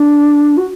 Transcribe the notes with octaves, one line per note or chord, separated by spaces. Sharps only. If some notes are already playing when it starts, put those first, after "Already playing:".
Already playing: D4
F#4